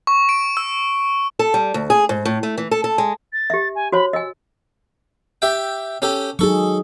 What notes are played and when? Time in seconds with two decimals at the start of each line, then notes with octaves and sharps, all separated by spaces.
0.07 C#6
0.29 D7
0.57 E6
1.39 A4
1.54 G3
1.74 D2
1.90 G#4
2.09 G#2
2.25 A2
2.43 A3
2.58 E3
2.71 A4
2.84 A4
2.98 G#3
3.33 A6
3.50 G4 E5
3.75 G#5
3.92 F#4 C5 C#5 B5
4.13 D#5 G#5 E6
5.42 G4 E5 G5
6.02 C#4 G4 A4
6.39 F#3 D#4 G#4 A4 C#6